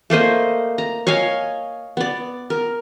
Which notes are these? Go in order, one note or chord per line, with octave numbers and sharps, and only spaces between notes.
A3 A#3 C5 D#5
A#5
C#5 D#5 F5 G#5
B3 D5
A#4